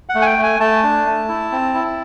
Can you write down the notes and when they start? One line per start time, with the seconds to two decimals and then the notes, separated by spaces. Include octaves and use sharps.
0.09 F#5
0.15 A3
0.22 G#5
0.26 G5
0.38 A3
0.43 G#5
0.60 A3 A5
0.83 D4
1.06 A3
1.28 E4
1.52 C4
1.74 E4